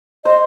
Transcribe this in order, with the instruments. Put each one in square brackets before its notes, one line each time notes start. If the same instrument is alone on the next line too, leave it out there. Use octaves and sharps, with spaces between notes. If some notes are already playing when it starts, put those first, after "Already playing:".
[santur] C5 [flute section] D#5